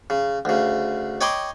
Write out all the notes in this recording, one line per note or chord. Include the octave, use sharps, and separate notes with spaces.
C#3
D2 C#3
C#5 D#5 G5 B5 C6 D6